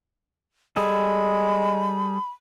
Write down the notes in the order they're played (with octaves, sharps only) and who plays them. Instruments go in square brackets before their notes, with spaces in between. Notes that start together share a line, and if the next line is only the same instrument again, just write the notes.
[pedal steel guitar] G3 G#4 A4 [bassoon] G#3 [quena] B5